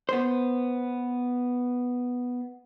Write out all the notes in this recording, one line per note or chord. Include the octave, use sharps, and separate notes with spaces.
B3 C5